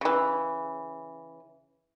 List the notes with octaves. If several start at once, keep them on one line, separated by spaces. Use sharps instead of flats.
C#3 E3